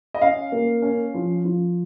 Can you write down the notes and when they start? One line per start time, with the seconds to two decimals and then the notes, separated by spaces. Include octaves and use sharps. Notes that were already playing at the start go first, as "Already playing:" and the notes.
0.14 D#5
0.21 C#4 F5
0.52 A#3
0.82 C#4
1.14 F3
1.44 F3